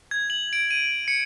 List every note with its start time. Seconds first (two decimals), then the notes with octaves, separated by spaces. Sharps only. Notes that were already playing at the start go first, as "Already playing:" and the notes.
0.11 G#6
0.30 F#7
0.53 D7
0.71 D#7
1.08 C#7